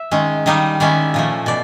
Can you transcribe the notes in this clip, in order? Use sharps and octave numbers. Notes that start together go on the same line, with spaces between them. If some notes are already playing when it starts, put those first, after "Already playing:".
Already playing: E5
D#3 G#3 C#4
D#3 G3 A#3 D#4 D#5
D#3 G#3 C#4 E4 D5
A#2 F3 A3
B2 D5